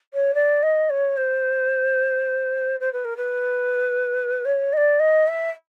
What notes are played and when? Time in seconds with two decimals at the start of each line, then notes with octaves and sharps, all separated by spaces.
0.14 C#5
0.34 D5
0.63 D#5
0.90 C#5
1.17 C5
2.80 C5
2.93 B4
3.05 A#4
3.17 B4
4.45 C#5
4.73 D#5
4.77 D5
5.00 D#5
5.27 E5